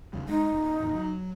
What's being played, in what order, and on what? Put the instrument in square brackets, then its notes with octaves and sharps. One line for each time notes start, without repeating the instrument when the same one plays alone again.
[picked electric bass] D#2 C#3 G3
[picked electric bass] G#3 [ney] D#4
[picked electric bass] D#1
D1 D#2
F#3